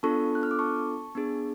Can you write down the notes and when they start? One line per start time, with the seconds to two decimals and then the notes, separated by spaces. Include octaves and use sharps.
0.03 B3 D4 F4 A4 A5 C#6
0.35 F#6
0.43 F6
0.51 D6
0.59 A5 C#6
1.15 B3 D4 G#4